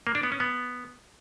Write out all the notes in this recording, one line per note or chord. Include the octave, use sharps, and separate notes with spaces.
A#3
D4
B3
C#4
B3